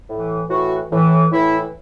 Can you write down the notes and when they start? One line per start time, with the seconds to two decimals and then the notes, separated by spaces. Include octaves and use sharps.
0.08 A2 E3
0.49 A2 E3 F#4
0.90 A2 E3
1.31 A2 E3 E4